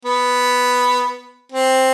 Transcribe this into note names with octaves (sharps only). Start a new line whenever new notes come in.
B3
C4